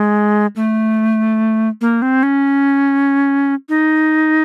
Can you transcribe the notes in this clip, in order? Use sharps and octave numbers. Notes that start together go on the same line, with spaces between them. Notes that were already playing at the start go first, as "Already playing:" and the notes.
Already playing: G#3
A3
A#3
C4
C#4
D#4